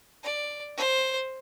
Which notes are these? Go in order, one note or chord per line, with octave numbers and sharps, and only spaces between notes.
D5
C5